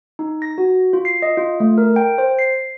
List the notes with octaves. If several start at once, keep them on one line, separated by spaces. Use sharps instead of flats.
D#4
A#6
F#4
F4
C7
D#5
F4
A3
A#4
G5
C5
C7